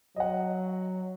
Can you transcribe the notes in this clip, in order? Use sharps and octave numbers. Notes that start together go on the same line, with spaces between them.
F#3 D#5 F#5